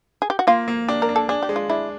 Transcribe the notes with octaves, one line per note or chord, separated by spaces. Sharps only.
G#4
G4
F#4
A#3 F4
A#3
D4 G4
A#4
D4
A4
D4 G#4
G4
G#3
F4
D4 E4